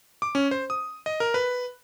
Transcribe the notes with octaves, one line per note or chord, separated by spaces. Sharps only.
D6
C#4
C5
D#6
D#5
A#4
B4